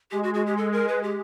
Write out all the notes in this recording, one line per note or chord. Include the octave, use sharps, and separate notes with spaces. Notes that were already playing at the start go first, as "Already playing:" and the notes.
G#3 G4
F#4
F#4
G4
A4
A#4
B4
G4